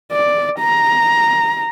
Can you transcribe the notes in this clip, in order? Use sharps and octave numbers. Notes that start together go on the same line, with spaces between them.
D5
A#5